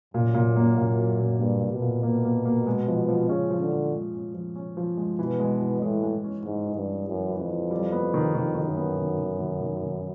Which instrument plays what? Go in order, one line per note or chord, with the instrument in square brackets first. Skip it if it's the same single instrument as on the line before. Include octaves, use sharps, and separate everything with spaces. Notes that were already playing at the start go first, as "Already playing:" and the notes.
[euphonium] F#2 [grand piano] A#2
[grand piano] A#2
A#3
A#2
F#3
A#2
[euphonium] G2 [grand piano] A#3
[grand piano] A#2
[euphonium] B2
[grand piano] A#2
[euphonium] B2 [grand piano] A#3
[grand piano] A#3
A#3
G#3
F3
F3
[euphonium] C#3 [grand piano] C#4
[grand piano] F3
[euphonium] D3
[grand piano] F3
G#3
C#4
F3
C#4
F3
G#3
[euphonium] B2 [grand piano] E3
[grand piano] G#3
E3
[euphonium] A2 [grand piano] G#3
[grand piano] G#3
C#4
[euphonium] G#2 [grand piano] G#3
[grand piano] E3
[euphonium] G2
[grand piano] C#4
[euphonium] F#2 [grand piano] E3
[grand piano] E3
[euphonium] F2
[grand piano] E3
G3
B3
D#3
[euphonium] F2 [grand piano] D#3
[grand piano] D#3
[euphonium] F#2
[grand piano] B3
D#3
D#3
D#3
D#3
D#3